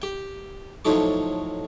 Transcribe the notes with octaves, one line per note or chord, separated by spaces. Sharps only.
G4 G5
A2 F3 F#3 D#4 A4 D6